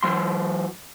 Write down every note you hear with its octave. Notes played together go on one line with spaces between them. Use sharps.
E3 F#3 C6